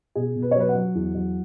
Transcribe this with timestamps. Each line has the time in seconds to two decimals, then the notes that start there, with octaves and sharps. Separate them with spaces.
0.15 B2 G#4
0.36 B2
0.42 B4
0.51 C#5
0.56 F#3 B4
0.69 F#5
0.75 F#3
0.95 E2
1.15 F#3